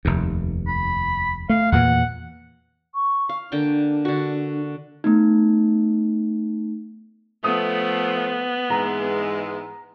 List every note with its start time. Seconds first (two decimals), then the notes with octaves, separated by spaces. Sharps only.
0.05 F1 D#2
0.68 B5
1.50 A3 F5
1.72 E2 A#2 E3 F#5
2.95 C#6
3.29 F5
3.52 D3 A#3 D4 G5
4.05 D3 F#4
5.04 A3 B3 D#4
7.44 F3 A3 B3 D#6
8.70 G#2 E3 G#3 A#5